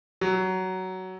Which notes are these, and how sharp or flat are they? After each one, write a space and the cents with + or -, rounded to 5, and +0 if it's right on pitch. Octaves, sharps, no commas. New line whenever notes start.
F#3 +15